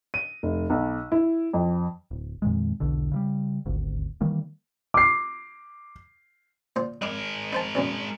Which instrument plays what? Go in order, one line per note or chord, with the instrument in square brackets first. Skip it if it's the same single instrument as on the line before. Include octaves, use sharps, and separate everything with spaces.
[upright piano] D#7
F1
B1
E4
F2
[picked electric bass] D1
F2 A#2 D#3 G#3
B1 E2 B2 D3
C#3 E3 G3
D#1 G#1 D2
D#3 E3 G3 A#3
[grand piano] D6 C7
[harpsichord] A#2 C5
[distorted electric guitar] G#3 A#4 [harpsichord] D#5 D6
[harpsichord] D#4 C5 A5
A#1 F#2 B2